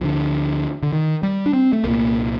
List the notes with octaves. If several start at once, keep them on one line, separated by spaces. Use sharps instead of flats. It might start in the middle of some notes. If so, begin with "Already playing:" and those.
D2 D3 F3
D3
D#3
G3
D4
C4
A3
C2 A#2 A#3